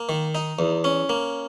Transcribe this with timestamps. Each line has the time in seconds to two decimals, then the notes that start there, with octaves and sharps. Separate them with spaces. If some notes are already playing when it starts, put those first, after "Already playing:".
Already playing: A#3
0.09 D#3
0.35 D#4
0.59 E2
0.84 C#4
1.09 A#3